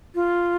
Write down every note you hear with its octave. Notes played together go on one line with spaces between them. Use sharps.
F4